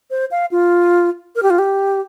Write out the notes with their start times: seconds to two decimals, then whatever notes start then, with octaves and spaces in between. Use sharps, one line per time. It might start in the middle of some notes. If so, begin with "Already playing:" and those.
0.11 C5
0.31 F5
0.51 F4
1.36 A#4
1.43 G4
1.50 F4
1.59 G4